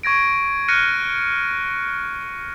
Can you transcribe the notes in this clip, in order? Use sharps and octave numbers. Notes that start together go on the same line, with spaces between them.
C#6 G#6 A#6 D7
F6 F#6 A#6 C#7 D#7